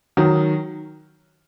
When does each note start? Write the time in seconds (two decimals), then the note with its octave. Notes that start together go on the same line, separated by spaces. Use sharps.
0.17 D#3 F#3